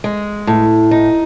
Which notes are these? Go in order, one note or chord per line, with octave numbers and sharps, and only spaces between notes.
G#3
A2
D#4